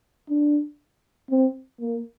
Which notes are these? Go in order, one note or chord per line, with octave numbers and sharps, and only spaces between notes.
D4
C4
A#3